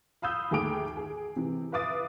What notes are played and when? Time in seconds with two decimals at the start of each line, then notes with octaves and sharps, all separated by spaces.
0.22 F5 B5 D#6 E6 G6
0.51 D#2 A3 G#4 G5 D6 D7
0.97 G#4
1.36 C3 E3
1.72 B4 E5 F5 D6 D#6 A6